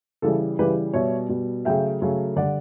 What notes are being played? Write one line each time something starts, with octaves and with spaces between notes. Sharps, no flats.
C#3 E3 G3 A4
C#3 E3 G3 G4 B4
B2 G3 C#5 E5
B2 G3
C#3 F#3 A3 E5 G5
C#3 F#3 A3
D3 G3 D5 F#5